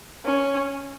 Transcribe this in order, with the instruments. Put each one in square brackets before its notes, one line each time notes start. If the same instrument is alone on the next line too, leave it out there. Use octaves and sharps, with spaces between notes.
[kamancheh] C#4